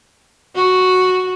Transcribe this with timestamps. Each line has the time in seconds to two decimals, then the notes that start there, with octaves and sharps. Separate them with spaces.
0.55 F#4